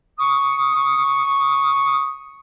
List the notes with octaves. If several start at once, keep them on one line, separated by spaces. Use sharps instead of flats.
C#6 D#6